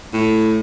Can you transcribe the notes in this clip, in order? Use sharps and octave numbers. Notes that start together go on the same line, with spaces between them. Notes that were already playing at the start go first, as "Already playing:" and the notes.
A2